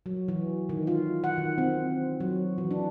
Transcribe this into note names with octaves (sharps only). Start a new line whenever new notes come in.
F#3
E3
D#3
F4
F#5
D#3
C4
F#3
E3
D4